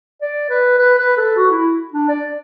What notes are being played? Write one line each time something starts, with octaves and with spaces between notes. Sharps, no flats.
D5
B4
B4
B4
A4
F#4
E4
D4
D5